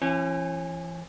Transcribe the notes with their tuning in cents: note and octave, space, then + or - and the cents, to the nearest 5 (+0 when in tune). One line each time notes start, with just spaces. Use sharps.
E3 +40 C#4 -30